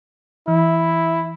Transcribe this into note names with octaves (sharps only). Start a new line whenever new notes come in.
E3 E4